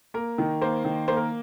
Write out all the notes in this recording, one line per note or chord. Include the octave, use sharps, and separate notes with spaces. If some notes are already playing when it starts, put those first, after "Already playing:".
A#3 A#4
D#3
A#3 C5
D#3
A#3 C5
A#4